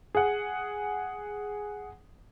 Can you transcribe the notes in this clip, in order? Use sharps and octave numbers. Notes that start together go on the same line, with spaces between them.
G#4 F#5